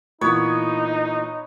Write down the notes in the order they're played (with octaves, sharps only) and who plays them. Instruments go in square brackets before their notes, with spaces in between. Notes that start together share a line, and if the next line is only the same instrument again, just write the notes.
[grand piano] A#2 E3 [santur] B3 C#5 [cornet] D#4